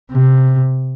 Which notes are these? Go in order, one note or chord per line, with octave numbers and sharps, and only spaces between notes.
C3